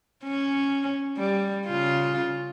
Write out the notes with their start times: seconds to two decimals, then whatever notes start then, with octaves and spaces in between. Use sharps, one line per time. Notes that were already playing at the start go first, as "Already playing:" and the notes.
0.24 C#4
1.18 G3
1.67 C#3 F4